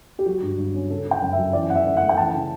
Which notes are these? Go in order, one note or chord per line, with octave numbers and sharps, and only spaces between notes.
G4
F#3 F#4
G2
G2
C#4
C#3 A4
C#4
G5
F#2
E5
F#3
E3 D5
F#2 F#5
E5
F#2
F#5
A3
G5
E3 A5
C#3